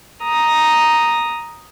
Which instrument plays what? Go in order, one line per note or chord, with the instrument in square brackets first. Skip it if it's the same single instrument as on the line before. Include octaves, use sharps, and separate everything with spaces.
[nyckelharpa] A#5 D#6